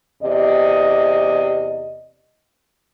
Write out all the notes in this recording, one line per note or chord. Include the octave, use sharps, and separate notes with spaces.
E2 C3 D5 D#5